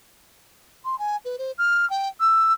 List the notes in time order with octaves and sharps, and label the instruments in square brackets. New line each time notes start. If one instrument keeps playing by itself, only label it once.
[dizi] C6
G#5
B4
C5
F6
G5
E6